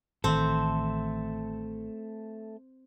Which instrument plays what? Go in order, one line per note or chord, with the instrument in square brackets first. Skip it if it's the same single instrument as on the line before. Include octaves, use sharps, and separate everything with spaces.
[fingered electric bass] A1 D#3 E3 [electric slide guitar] A3 A4 [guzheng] C4